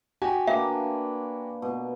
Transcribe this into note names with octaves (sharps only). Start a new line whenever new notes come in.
F#4 G4 G#5
A#3 D4 B4 E5
B2